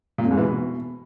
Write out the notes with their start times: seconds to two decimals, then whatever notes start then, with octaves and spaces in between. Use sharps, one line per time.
0.18 A#2
0.25 F2
0.31 G#2
0.37 E3
0.44 B2